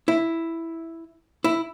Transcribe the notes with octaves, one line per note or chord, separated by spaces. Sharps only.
E4
E4